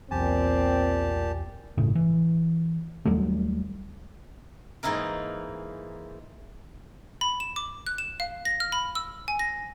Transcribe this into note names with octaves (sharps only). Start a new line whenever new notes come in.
B1 E2 A#2 C4 G4 G#5 A5
G1 A2 C#3
E3
D#2 F#3 G3 A3
G#2 E3 A#3 D#4 E4 A#4
B5
E7
D6
F#6
E7
F5
A#6
F6
B5
E6
G#5
A#6